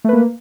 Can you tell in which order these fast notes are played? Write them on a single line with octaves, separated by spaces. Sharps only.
A3 B4 A#3